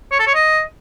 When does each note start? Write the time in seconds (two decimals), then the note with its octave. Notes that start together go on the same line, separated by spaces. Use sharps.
0.12 C#5
0.19 A4
0.27 C#5
0.34 D#5